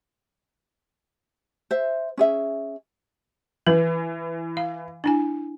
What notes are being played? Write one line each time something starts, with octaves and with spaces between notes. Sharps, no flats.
C5 E5
C#4 G#4 E5
E3 B4
F5
D4 E4 G#5